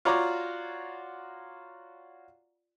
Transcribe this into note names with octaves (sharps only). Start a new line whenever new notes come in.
F4 F#4 C#5 D5 A#5